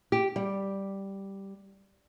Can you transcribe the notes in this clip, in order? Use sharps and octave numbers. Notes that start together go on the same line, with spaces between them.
G4
G3